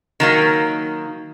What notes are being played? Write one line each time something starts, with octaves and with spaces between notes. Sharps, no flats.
D#3 F#3 A#3